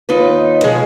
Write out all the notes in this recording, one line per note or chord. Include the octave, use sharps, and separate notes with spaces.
D#2 D#4 F4 B4
B2 F3 G#3 G#4